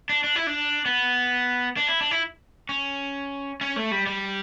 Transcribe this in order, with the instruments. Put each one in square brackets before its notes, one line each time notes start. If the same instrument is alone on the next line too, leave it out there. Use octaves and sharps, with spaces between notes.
[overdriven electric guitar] D4
D4
E4
D4
B3
D4
E4
D4
E4
C#4
C#4
A3
G3
G3